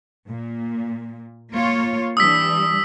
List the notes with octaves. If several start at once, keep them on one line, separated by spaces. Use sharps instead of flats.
A#2
A#3 F4 C#5
E3 G3 D4 D#6 E6 B6